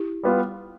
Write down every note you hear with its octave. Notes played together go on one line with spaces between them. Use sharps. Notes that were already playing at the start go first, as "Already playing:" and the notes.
Already playing: E4 G4
G3 B3 F4